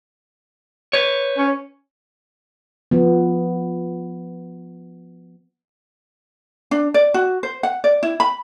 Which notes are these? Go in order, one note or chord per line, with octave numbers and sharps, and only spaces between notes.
B4 C#5
C#4
F3 B3
D4
D5
F#4
C5
F#5
D5
E4
B5